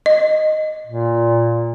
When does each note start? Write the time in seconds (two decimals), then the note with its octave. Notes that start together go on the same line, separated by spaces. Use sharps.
0.06 D#5
0.86 A#2